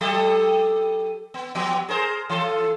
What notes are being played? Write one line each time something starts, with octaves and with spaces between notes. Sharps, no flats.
F#3 G4 A4
B3
F3 B3 G4
G#4 A#4 C5
E3 A4